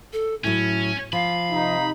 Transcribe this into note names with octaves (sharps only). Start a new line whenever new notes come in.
A4
A2 F#3 C#4 E4
F3 F5 B5
C3 D#4